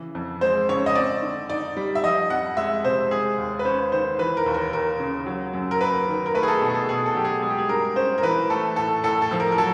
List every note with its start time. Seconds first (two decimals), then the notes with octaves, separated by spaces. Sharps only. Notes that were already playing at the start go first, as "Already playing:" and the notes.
Already playing: C#3 E3
0.15 F2
0.41 G#3 C5
0.69 C#3 C#5
0.86 D#5
0.95 C4 D5
1.22 D3
1.49 D#4 D5
1.77 G3
1.95 E5
2.03 F3 D#5
2.30 F2 F#5
2.57 G#3 E5
2.85 C3 C5
3.11 G#3 G#4
3.38 D#2
3.59 B4
3.65 C#4 C5
3.92 D#3 C5
4.19 E3 B4
4.37 A#4
4.46 D#2
4.54 A#4
4.73 D#2 A#4
5.00 C#3
5.26 F#3
5.53 F#2
5.71 A#4
5.81 A#3 B4
6.08 D#3
6.26 A#4
6.34 A3 B4
6.43 G#4
6.48 A4
6.61 B2
6.69 G#4
6.75 A4
6.88 B2 G#4
7.06 A4
7.15 F#3 G4
7.25 G#4
7.42 G#3 G#4
7.50 G4
7.58 G#4
7.69 G2 A#4
7.96 C#4 C5
8.18 A#4
8.23 E3 B4
8.50 A3 A4
8.76 A2 A4
9.03 A2 A4
9.22 A4
9.31 F3
9.40 A#4
9.52 A#4
9.58 F#3 A4